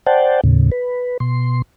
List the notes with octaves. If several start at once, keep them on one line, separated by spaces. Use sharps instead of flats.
C5 D5 F#5 G5 A5
D#2 A2 C#3
B4
B2 C6